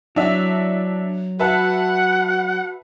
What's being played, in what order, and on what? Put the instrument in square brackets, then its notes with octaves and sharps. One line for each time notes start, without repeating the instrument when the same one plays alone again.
[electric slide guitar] F#3 [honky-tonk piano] D4 E5 [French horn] E4
[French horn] F#4 [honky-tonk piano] B4 E5 A5 [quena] F#5